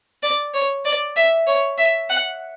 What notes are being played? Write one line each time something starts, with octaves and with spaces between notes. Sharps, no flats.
D5
C#5
D5
E5
C#5
E5
F#5